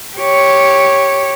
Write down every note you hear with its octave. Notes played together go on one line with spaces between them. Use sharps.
G4 C#5